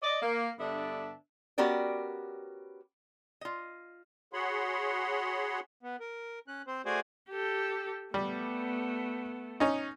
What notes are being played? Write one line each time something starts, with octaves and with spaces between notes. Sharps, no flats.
D5 D#5
A#3
G2 D3 B3 D4 D5 E5
B3 C#4 F#4 G4 A#4 D5
F4 D#5
F#4 G#4 C#5 F#5 B5 C6
B3
A#4
C#4 F#6
C4 C5
A3 F#4 G#4 C5 D5 G#5
G4 A4
G3 A3 B3
C#4 D#4